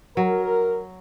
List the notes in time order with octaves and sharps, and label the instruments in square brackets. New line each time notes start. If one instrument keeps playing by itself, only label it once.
[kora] F#3 [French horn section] A#4